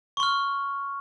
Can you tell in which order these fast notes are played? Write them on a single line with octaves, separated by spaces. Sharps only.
C#6 C6 F6